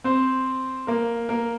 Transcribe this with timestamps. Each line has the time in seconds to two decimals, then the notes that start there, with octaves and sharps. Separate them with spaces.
0.04 C4 C5
0.87 A#3 A#4
1.29 A#3 A#4